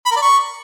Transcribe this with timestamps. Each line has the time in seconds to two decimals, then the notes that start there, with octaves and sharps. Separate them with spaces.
0.06 B5
0.11 A#4
0.16 D5
0.22 C#6